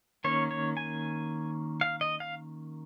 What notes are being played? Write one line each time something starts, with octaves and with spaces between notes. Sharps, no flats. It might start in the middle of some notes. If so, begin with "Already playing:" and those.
D#3 A#3 C#4 C#5
C#5
G#5
F5
D#5
F5